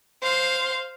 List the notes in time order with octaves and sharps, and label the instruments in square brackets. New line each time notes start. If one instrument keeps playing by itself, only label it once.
[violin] C5 F5